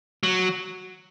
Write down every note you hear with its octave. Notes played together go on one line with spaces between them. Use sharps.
F#3